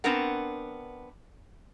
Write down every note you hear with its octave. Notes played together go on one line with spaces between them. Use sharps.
B3 C4 D4 A#4 F#5